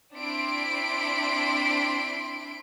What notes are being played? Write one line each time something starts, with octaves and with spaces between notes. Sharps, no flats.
C4 D4 E4 C6 B6 D7